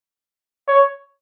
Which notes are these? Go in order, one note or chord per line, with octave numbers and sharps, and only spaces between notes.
C#5